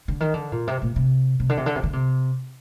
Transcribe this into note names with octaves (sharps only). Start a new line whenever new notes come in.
D3
D#3
D3
A#2
C3
A#2
C3
C3
D3
C3
D3
C3
D3
C3